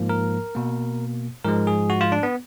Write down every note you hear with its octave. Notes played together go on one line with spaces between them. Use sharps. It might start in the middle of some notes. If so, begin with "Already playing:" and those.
Already playing: G#2 F3 A#3
A#4
B2 A#3
G#2 F3 G#3 A#4
G#4
F#4
F4
D4
B3